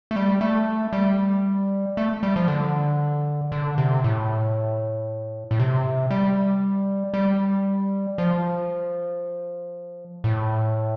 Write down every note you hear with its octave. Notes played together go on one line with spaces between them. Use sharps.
A3
G3
A3
G3
A3
G3
F3
D3
D3
C3
A2
A2
C3
G3
G3
F3
A2